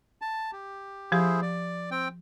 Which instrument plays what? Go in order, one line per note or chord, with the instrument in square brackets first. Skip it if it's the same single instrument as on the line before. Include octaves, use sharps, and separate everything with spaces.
[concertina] A5
G4
[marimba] F3 G4 [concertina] E4 G#4 C5
[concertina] D5
C4 G5